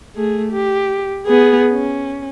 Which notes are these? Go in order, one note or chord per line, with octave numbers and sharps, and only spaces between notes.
A3 G#4
G4
B3 G#4
C#4